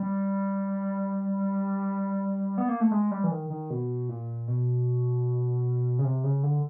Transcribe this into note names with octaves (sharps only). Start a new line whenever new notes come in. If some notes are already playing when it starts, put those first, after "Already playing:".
Already playing: G3
B3
A#3
A3
G#3
G3
E3
D#3
D#3
B2
A#2
B2
C#3
C3
C#3
D3